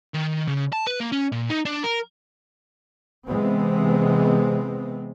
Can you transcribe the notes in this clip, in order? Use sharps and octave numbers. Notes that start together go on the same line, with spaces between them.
D#3
C#3
A5
B4
A#3
C#4
A#2
D#4
D4
A#4
C3 E3 G#3 B3 C4